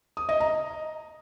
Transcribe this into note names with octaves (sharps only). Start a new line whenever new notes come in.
D#6
D#5
A#5